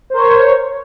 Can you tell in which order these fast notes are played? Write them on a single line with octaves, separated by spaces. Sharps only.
C5 A#4 C#5